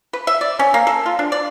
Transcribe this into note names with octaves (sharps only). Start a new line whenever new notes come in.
B4
E5
D5
C#4
A#3
A4
F4
D4
D5